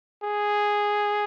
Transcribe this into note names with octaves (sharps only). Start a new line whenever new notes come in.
G#4